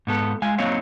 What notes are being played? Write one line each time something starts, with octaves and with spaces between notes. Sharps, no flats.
G#2 B3 A4
G#3 F5 G#5
F#3 A#3 C4 D#4 C#5 F5